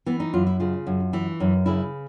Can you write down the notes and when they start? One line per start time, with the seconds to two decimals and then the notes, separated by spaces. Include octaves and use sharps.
0.06 E3 B3
0.20 D#4
0.34 F#2 F4
0.47 E4
0.60 C#3 F4
0.87 F#2
1.13 E3
1.40 F#2
1.66 C#3 E4